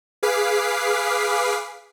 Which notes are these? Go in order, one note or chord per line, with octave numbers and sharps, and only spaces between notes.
G#4 B4 F5 D6 B6 C7